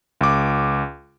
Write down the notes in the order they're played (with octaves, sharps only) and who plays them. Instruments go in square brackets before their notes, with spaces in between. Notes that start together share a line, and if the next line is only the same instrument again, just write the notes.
[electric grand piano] C#2 D6